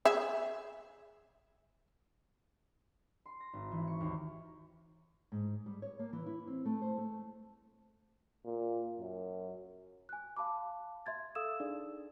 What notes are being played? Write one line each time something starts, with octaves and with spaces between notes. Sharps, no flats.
G#4 E5
C6
A#6
G#1
E3
C#6
D#2
G#2
G3
C#5
A#3
E3
E4
C4
A3
C5
A3
A#2
F#2
G#5 F#6
F5 A5 B5 D6
E5 C6 G#6 A6
A4 F5 D#6 E6 E7
D4 D#4 G#4 D5